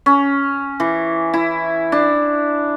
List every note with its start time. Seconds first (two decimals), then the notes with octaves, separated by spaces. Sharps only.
0.06 C#4
0.80 E3
1.34 E4
1.92 D4